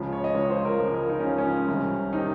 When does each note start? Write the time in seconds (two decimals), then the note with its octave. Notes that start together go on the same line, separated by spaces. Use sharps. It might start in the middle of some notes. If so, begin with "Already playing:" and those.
Already playing: C#2 C#3 F3
0.12 C#5
0.24 D#5
0.35 C#2 C#3 F3 C#5
0.50 C5
0.65 A#4
0.80 C#2 C#3 F3
0.94 A#4
1.09 D#4
1.19 C#4
1.24 C#2 C#3 F3
1.38 C#4
1.68 C2 C3 D#3
2.13 C3 D#3 D#4